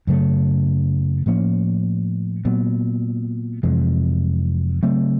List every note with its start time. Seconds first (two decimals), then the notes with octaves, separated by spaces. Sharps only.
0.07 F#2 C#3 F#3 A3
1.26 A2 F3 A#3 C#4
2.45 A#2 F#3 B3
3.63 F2 C3 E3 G#3
4.83 C#3 F#3 A3 C4